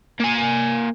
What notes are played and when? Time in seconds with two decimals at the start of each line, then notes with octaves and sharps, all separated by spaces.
0.20 A#3 G#5